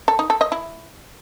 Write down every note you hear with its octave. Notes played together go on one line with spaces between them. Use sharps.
A4
D#4
A4
D#5
E4